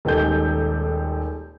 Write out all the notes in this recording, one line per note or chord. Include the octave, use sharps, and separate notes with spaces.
D#1 D#3 G#3 G4 A4 G6